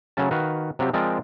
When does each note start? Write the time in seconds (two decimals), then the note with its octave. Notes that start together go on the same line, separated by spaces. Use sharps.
0.17 C#3 F#3 A3 C#4 A5
0.31 D#3 F#4 B4 F5
0.79 C3 F#3 C4 F4 G4
0.94 F3 G#3 C4 F4 A#4 D5